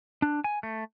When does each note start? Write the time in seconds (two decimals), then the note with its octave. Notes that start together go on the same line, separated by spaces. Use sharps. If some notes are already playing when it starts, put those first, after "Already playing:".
0.22 D4
0.44 G#5
0.63 A3